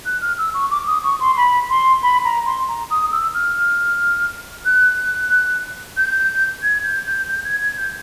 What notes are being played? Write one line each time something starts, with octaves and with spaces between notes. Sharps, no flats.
F#6
F6
E6
C#6
D6
D#6
C#6
C6
B5
C6
B5
A#5
C6
A#5
D#6
E6
F6
F#6
G6
G#6
G6
G6
G6
G#6
G#6
G6